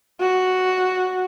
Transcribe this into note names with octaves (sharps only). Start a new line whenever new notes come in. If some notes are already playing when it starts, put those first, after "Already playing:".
F#4